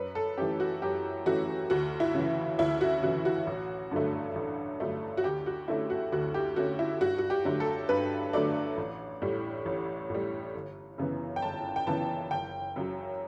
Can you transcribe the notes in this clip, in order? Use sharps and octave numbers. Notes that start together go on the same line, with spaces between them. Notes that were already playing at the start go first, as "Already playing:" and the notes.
Already playing: F#2 B4
A4
E3 A3 C#4 G4
F#4
F#2 G4
E3 A3 C#4 F#4
D2 F#4
E4
C#3 E3
D2 E4
F#4
C#3 E3 F#4
F#4
A1
G2 D3 F#3 A3
A1
G2 D3 F#3 A3
F#4
D2 G4
F#4
D3 A3 C#4 E4
F#4
D2 F#4
G4
D3 A3 C#4 F#4
E4
G2 F#4
F#4
G4
D3 F#3 A3
A4
G2 B4
D3 F#3 A3 D5
A1
A2 G3
A1
A2 G3
G1
F#2 C#3 E3 B3
G5
G1 A5
G5
F#2 C#3 E3 B3 A5
F#1 G5
F#2 C#3 F#3